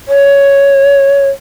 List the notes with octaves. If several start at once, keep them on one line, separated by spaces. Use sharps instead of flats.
C#5